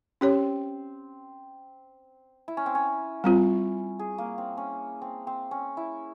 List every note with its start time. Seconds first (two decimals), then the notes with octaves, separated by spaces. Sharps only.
0.21 C4 C#4 G4 C#5
2.48 E4
2.57 C#4
2.66 C4
2.75 C#4
3.24 G3 C4 F4
3.99 G#4
4.18 A#3
4.38 C4
4.57 C#4
5.02 C4
5.27 C4
5.51 C#4
5.77 E4